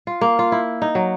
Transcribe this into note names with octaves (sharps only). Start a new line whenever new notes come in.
F4
A#3
F4
E4
D#4
F#3